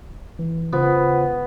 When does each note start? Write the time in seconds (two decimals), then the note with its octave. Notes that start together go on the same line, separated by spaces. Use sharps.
0.39 E3
0.73 C#3 B3 F4 C5